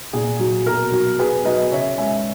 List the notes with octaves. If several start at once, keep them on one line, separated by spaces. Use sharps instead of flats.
A#2 G#4
F#3
B2 A#4
F#3
B2 G#4 B4
F#3 B4 D#5
C#3 C#5 E5
G#3 E5 G#5